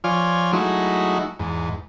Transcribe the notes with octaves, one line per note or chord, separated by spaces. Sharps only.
F3 F4 C#5 D5 G#5 F6
F#3 G#3 A3 D#4 E4 F#4
E2 G#2